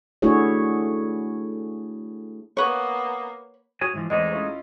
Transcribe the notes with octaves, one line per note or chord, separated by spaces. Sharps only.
A3 D4 E4 F#4 G#4 C#5
A#3 B3 B4 C#5
F#4 C#5 G#5 D#6
G#2 E3 F3
E2 G#3 A3 C4 D#4 D#5
C#4 E4 F4